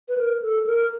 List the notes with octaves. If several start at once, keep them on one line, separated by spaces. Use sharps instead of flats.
B4
A#4
A4
A#4